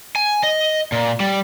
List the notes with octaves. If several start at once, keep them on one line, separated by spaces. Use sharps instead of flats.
G#5
D#5
A#2
G3